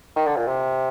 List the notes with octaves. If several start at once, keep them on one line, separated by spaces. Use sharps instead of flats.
D#3
D3
A#2
C3